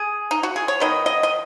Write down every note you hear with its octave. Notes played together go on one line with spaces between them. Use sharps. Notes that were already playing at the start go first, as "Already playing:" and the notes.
Already playing: G#4
D#4
F#4
G#4
C#5
D#3 B3 D#5
D#5
D#5